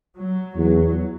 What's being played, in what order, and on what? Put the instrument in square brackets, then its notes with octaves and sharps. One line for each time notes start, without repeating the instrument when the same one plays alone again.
[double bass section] F#3
[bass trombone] E2 [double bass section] F#3